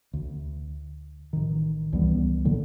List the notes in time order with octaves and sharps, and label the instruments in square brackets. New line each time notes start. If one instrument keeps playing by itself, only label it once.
[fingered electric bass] D2
A1 D#3
C#2 E3 G3 B3
A#2 D3 F#3 A#3